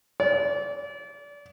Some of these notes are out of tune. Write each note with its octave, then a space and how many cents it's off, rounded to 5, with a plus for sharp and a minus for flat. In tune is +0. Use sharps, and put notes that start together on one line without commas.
D5 -30